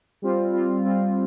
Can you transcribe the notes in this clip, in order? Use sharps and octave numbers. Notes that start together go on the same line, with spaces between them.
G3 C4 F4
G3 C4 F4
G3 C4 F4